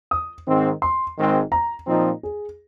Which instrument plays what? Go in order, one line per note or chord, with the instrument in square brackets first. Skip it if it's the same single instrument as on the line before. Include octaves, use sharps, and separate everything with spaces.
[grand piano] D#6
[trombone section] G#2 D#3 C4
[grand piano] C6
[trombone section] G#1 G#2 D#3 G#3 C4
[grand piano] A#5
[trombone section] A#2 F3 C4 D#4
[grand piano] G#4